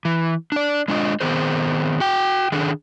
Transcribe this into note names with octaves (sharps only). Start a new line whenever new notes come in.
E3
D4 D5
G#3 D4 F4 D#5
D#3 B3 C4 G#4 C5
F#4 G5
D#3 D4 G#4 A4